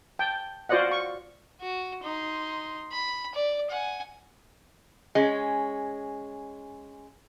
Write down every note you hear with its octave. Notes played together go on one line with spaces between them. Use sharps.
G5 A5
F4 F#4 C5 D5 D#5 F#5
C#6
F#4
D#4 C6
B5
D5
F#5 G#5
G#3 C#4